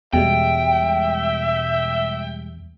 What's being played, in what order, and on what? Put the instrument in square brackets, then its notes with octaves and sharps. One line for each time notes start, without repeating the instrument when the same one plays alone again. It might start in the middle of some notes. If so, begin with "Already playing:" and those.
[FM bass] E2 [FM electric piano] B2 G3 G#3 [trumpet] E5 [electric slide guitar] G5